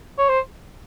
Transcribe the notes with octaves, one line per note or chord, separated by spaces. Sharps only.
C#5
C5